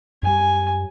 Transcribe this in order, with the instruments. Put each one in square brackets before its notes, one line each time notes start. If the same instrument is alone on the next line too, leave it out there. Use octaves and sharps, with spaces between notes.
[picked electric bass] F#2 G3 [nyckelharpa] G#5